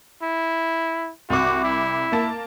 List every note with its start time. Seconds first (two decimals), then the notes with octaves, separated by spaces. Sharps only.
0.23 E4
1.30 C2 F#4 D6
1.64 E4
2.12 A#3 A5